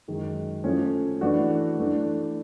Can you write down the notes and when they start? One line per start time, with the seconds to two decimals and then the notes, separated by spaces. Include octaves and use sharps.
0.08 F#2 D#3 G#3
0.64 F3 A3 C#4
1.21 E3 A3 D4 F#4
1.78 E3 A3 D4